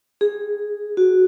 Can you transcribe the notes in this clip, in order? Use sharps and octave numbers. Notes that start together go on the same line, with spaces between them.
G#4
F#4